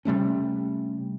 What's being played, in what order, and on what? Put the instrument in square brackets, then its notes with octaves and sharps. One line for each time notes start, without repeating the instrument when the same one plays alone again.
[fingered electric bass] C3 G3 A3 C#4